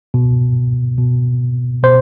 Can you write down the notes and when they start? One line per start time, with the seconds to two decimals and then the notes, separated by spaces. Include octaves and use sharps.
0.14 B2
0.98 B2
1.83 B2 C5